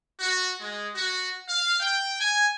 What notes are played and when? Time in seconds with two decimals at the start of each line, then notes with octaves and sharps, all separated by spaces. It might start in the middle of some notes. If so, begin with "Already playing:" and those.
0.19 F#4
0.60 G#3
0.95 F#4
1.48 F5
1.79 G5
2.19 G#5